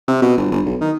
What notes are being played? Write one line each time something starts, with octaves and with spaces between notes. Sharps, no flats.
C3
B2
G1
G1
B1
D#3